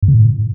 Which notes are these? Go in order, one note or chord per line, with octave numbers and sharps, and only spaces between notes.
G2
C#3
A2